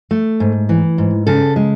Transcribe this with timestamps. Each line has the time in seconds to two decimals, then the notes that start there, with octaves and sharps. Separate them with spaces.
0.11 A3
0.40 G#2
0.69 E3
0.98 G#2
1.27 C#3 A4
1.56 G#3